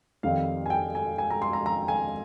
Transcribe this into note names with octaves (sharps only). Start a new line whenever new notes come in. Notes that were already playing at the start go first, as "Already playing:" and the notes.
F2 D#3 G3 C4 F5
G#5
G5
G#5
G#5
A#5
C6
A#5
A#5
G#5